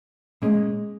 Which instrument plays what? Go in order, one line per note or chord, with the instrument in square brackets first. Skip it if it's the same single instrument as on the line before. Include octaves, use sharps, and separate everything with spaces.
[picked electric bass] A#2 A#3 C#4 [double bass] G#3